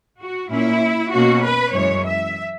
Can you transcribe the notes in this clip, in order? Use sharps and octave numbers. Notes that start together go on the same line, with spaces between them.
F#4
A#2 A#3 C#4 E4
B2 A#3 C#4 F#4
B4
F#2 E3 G#3 C#5
E5